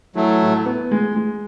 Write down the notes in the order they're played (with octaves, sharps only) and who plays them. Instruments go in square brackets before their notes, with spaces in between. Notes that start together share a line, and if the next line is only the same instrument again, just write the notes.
[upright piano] E3 [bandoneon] F#3 A3
[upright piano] A2
B3
G#3
G#3